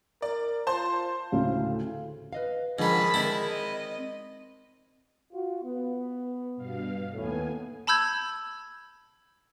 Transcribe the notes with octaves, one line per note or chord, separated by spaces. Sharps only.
A#4 D5
F4 C5 A5 C6
D2 A2 C#3 F5
B4 D#5 F5
G#2 D3 D#3 F3 D#4 G#4 A5 B5
D#3 G#3 C4 E4 D5
D#5
F4 F#4
B3
G2 B2 F5
D#2 A2 B3 G#5
A5 B5 E6 G6 G#6